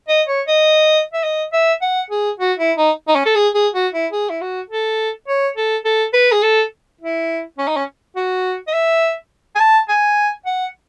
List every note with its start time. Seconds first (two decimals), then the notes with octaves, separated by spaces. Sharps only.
0.09 D#5
0.28 C#5
0.47 D#5
1.13 E5
1.24 D#5
1.53 E5
1.82 F#5
2.10 G#4
2.39 F#4
2.59 E4
2.77 D#4
3.08 D#4
3.16 C#4
3.26 A4
3.35 G#4
3.55 G#4
3.74 F#4
3.93 E4
4.12 G#4
4.30 E4
4.41 F#4
4.70 A4
5.28 C#5
5.57 A4
5.85 A4
6.13 B4
6.32 G#4
6.43 A4
7.01 E4
7.58 C#4
7.68 D#4
7.76 C#4
8.16 F#4
8.68 D#5
8.73 E5
9.55 G#5
9.60 A5
9.89 G#5
10.46 F#5